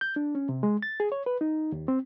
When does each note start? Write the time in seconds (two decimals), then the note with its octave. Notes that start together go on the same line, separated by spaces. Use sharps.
0.01 G6
0.16 D4
0.35 C#4
0.49 C3
0.63 G#3
0.83 A6
1.00 G#4
1.12 C#5
1.26 B4
1.41 D#4
1.72 D#2
1.88 C4